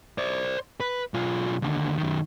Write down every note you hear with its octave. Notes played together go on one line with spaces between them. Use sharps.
C5 D5
B4
B1 F4
D#2 D3
F#2 D#3